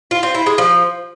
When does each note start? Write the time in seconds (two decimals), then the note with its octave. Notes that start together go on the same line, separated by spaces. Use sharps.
0.11 F4
0.23 C4
0.35 E4
0.46 G#3
0.58 F3